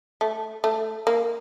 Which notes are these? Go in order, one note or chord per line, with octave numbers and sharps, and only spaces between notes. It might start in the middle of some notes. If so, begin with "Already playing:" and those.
A3
A3
A#3